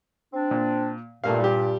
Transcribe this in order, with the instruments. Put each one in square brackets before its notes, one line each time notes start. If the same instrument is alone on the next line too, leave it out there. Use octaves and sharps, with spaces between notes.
[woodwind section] C4 D4
[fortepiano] A#2
[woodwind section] G2 A#2 [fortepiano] A3 A#3 F5
[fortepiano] G3 G4